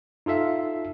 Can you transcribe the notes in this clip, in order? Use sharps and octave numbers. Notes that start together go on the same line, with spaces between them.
D#4 F4 A4 E5 F5